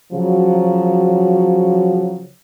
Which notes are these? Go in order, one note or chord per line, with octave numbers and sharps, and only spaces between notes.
C#3 F3 F#3